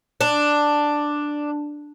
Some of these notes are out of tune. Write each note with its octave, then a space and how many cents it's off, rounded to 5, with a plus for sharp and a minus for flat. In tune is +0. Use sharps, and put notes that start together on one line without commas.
D4 +5